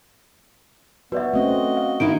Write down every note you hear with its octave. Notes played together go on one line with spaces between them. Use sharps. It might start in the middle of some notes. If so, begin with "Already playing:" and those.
B3 F#4 B4 D5 E5
A3 C4 C#4 F#4 D#5
F5
D#3 D#4 E4 D7